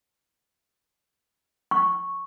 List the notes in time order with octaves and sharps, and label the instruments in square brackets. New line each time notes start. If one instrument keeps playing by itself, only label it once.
[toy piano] C#6